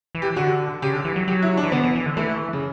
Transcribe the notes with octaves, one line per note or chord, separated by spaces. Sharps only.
E3
G4
D3 F#4
C#3 G4
D3
E3
F#3
F#3 G4
E4
D4
E3
D3 B3
E3
E3
D3
E3 A3
C#3